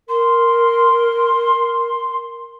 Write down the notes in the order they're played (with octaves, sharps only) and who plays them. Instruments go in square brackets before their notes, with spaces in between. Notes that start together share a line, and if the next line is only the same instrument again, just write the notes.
[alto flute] A#4 [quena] C6